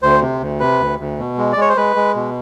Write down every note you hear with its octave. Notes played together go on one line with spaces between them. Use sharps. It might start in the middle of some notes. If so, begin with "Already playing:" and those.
D2 C5
C3
D2
C3 B4
D2
D2
B2
G#3
D5
G#3 C#5
C5
G#3 B4
G#3
B2